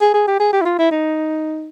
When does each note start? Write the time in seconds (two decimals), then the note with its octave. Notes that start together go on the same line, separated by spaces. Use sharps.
0.01 G#4
0.14 G#4
0.28 G4
0.40 G#4
0.53 G4
0.62 E4
0.65 F4
0.79 E4
0.91 D#4